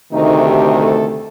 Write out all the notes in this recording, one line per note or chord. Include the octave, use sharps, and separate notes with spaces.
D2 C3 D#3 A3 D#4
G4
A4